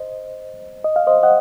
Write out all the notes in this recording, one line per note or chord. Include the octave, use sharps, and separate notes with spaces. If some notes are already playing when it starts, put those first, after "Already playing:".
Already playing: C5 D#5
D#5
F5
C5 D#5
D#5 F#5